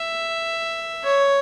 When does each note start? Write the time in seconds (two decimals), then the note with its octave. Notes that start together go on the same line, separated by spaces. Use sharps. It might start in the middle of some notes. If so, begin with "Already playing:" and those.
Already playing: E5
1.04 C#5